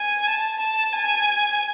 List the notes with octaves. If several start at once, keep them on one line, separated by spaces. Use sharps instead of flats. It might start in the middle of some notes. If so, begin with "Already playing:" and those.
Already playing: G#5
A5
A5
G#5